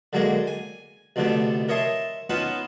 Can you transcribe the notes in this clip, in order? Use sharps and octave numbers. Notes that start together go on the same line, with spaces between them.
D3 F#3 G#3 A#3
G#5
C2 F2 B2 D3 A3
A#4 C#5 D#5 E5 A5 C6
B3 C#4 D#4 F4 B4 A5